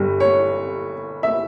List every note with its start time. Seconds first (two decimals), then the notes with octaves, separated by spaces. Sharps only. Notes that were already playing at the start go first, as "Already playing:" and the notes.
Already playing: G1 G2 G3
0.20 C#5
1.23 E5